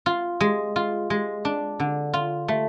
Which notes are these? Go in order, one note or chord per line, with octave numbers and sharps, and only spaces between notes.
F4
G#3
F4
G#3
D4
D3
F4
A3